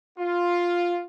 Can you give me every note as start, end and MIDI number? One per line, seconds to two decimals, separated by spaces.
0.18 1.07 65